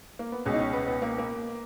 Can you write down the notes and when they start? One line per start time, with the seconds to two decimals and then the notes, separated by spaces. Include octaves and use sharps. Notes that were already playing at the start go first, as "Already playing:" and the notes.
0.19 A#3
0.32 B3
0.45 C#2 B2 G#3 C#4
0.54 D#4
0.59 C#4
0.73 B3
0.87 B3
1.02 A#3
1.18 A#3